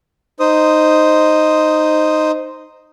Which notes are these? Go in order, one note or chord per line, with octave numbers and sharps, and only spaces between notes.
D#4 C5 D#6